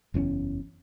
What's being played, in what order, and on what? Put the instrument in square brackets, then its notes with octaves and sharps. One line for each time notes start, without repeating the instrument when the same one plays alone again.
[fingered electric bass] F#1 E2 C4 C#4